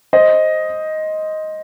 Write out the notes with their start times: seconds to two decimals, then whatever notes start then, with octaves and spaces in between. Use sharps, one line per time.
0.13 C5 D#5